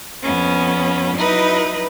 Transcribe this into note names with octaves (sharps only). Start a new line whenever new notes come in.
F2 B3 C#4
F#3 D#4 E4 B4 D#5